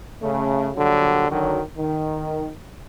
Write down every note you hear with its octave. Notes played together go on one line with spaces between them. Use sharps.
C#3 A3
A#2 D3 F#3 G3
D3 D#3 F#3
D#3